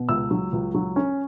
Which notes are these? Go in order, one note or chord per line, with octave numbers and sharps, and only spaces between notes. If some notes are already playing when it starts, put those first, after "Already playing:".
Already playing: B2
C#2 E6
F#3
C#2
F#3
C#4